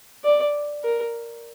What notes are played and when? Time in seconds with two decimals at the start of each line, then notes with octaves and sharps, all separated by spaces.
0.24 D5
0.84 A#4